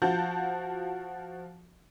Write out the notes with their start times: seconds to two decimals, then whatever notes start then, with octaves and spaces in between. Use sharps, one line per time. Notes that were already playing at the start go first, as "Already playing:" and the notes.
0.02 F3 F#4 A5 G6